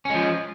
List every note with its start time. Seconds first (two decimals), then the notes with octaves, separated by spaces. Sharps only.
0.05 C#4
0.10 G#3
0.14 F3